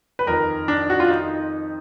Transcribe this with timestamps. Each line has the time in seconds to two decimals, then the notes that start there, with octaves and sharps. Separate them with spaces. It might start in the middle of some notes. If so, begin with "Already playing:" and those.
0.19 B4
0.27 F2 D#3 A#4
0.68 D4
0.90 F#4
1.00 F4
1.11 D#4